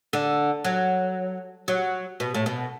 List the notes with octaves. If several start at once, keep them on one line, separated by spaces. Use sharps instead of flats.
D3
F#3
F#3
B2
A2
B2